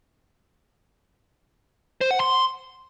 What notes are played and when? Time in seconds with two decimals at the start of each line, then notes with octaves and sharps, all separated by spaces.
2.01 C5
2.11 F#5
2.20 C6